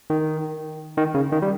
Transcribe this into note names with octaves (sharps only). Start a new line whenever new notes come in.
D#3
D#3
C#3
D#3
G3